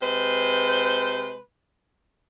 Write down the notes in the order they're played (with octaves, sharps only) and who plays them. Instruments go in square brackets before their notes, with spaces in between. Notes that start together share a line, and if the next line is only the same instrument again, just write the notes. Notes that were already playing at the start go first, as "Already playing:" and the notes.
[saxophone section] C3 G#3 B4 C5